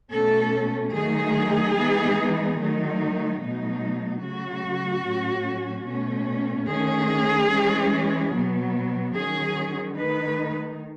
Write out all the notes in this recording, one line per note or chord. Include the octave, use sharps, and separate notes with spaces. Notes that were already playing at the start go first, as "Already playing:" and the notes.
B2 A3 C#4 A4
D#3 F#3 A3 D#4 G#4
E3 G#3 B3 D#4
D#3 F#3 A3 D#4
B2 F#3 A3 D#4
C#3 F#3 A3 F#4
A2 F#3 C#4
B2 A3 C#4
D#3 A3 C#4 G#4
E3 G#3 C#4
B2 F#3 B3
D#3 F#3 C#4 G#4
D#3 A3 D#4 B4